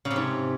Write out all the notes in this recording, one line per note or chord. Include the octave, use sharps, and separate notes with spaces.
C#3
C3
G#2